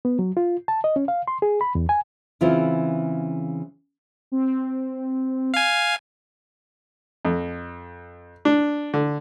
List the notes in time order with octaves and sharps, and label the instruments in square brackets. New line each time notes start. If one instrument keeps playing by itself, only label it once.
[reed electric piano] B3
F#3
F4
A5
D#5
C#4
F5
C6
G#4
B5
E2
G#5
[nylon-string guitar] C#3 E3 C4 E4 F4
[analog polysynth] C4
[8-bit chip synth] F5 G#5
[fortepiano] F2
D4
D3